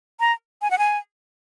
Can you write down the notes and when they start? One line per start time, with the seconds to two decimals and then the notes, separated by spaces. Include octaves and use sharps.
0.20 A#5
0.62 G#5
0.71 F#5
0.78 G#5